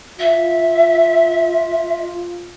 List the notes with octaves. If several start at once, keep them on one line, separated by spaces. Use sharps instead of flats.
F4 E5